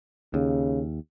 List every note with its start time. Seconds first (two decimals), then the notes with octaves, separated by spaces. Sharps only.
0.34 D#2 C#3